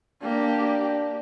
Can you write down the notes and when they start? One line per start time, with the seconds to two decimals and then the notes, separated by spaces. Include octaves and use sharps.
0.22 A#3 D4 G4